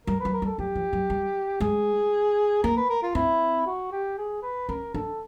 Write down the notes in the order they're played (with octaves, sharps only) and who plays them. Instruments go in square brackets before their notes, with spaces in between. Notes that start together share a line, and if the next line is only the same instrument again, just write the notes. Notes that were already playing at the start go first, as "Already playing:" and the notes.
[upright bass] G3 [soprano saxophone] A#4
[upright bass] F#3 [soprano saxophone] B4
[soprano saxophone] A#4
[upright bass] G3
[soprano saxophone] A4
[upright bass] F#3 [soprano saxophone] G4
[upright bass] F3
F#3
G3
[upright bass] G#3 [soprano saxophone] G#4
[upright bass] A#3 [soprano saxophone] A#4
[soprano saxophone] B4
A#4
F4
[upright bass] C4 [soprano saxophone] E4
[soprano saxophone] F#4
G4
G#4
B4
[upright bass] C#4 [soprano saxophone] A#4
[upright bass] D4 [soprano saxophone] A4